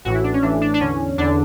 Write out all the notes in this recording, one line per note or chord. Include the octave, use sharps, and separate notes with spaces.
A1 A2 E3 F#4
E4
D4
C#4
A1 A2 E3 D4
D4
D4
E2 D3 C#4
E2 D3 D4